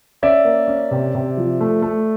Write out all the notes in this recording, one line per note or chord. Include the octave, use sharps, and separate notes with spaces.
C#4 D5 E5
A#3
C#4
C3
C3
F3
A3
A3